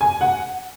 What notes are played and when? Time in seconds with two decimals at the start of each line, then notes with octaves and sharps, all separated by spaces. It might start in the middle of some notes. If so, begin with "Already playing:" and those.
0.01 G#5
0.21 F#5